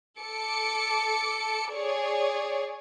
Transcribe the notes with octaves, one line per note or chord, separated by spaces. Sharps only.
A4 D6 C#7
G#4 C#5 D5